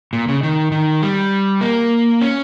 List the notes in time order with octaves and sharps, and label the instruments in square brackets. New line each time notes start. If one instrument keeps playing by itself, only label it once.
[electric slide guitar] A#2
C#3
D#3
D#3
G3
A#3
C#4